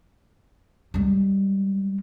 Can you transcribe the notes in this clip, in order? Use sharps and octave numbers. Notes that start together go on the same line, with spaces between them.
G3 G#3